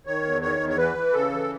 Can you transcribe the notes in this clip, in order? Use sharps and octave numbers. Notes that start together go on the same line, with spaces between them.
D#3 C#5
E2
D#3 C#5
E2
C#5
E3 B4
E3
C#3 A4
E3